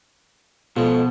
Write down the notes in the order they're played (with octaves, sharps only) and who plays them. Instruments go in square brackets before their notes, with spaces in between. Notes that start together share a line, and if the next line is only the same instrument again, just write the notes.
[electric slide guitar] B2 [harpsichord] F3 G#3 [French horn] A4